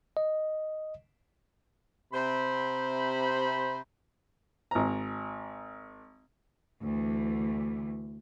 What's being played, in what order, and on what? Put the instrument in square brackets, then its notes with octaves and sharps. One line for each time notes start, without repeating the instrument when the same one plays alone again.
[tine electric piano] D#5
[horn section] C3 C5 B5
[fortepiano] G#1 A#5
[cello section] D2 E3